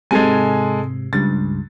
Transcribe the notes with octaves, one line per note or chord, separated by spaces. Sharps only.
G#2 C3 G#3 A4 G#5
C#2 G2 A6